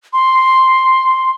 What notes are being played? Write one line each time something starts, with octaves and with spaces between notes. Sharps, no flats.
C6